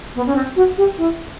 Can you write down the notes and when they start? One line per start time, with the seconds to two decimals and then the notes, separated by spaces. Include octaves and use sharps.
0.16 B3
0.27 C#4
0.36 C4
0.56 F#4
0.78 G4
0.98 E4